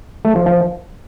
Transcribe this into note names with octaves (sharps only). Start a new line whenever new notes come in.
A3
F3
F3